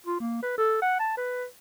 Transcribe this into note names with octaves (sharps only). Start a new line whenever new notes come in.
F4
A#3
B4
A4
F#5
A5
B4